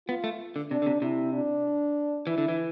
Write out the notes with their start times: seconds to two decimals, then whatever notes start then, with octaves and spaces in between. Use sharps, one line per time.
0.08 B3 F4
0.24 A3
0.56 D3
0.71 C3 D4
0.82 D3
0.86 C3
1.02 C3 E4
1.33 D4
2.27 E3 E4
2.38 D3
2.48 E3